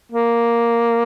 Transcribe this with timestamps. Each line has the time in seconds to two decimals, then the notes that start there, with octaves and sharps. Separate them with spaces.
0.12 A#3